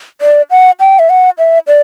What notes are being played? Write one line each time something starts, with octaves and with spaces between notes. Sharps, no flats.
D5
F#5
G5
E5
F#5
E5
D5